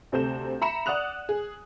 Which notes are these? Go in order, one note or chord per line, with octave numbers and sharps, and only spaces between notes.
D2 C3 C4 A4 G6 E7
E5 A#5 B5 C#7 E7
D5 F#5 D#6 F#6 F7
G#4